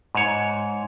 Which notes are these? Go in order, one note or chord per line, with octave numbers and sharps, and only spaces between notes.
G#2 C#5